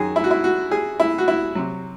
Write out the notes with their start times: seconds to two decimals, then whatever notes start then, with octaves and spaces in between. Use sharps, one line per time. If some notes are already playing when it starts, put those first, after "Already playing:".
Already playing: F#2 D#3 F#3 G#4
0.16 E4
0.24 F#4
0.31 E4
0.44 F#4
0.71 G#4
1.00 E4
1.18 F#4
1.28 E4
1.55 C3 F#3